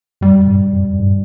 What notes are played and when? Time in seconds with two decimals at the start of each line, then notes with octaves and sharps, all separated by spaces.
0.21 F2 G3
0.47 G2
0.73 F2
0.99 G2